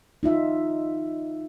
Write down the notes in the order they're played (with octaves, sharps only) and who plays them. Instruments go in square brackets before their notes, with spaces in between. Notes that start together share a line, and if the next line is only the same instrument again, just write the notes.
[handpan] D#4 F4 E5